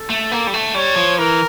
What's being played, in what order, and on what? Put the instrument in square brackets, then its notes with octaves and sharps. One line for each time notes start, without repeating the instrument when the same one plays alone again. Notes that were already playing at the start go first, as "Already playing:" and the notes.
Already playing: [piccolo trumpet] A4
[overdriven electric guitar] A3
A#3
G3
A3
[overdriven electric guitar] G3 [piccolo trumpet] C#5
[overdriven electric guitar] F3
[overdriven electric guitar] E3 [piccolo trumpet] A#4